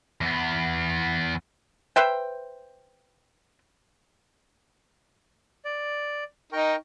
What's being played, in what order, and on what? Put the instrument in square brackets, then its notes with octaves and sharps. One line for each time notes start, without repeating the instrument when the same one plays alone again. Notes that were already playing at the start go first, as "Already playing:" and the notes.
[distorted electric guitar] E2 B3
[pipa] B4 C5 E5 G5
[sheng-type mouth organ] D5
[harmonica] D#4 [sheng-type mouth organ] A#4 G5 C#6